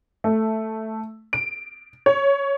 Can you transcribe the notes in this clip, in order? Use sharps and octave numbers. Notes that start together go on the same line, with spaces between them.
A3
D7
C#5